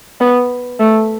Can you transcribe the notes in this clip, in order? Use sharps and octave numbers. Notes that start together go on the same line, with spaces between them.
B3
A3